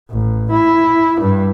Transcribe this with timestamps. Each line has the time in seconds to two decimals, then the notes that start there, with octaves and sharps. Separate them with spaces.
0.11 A1
0.51 E4
1.20 G2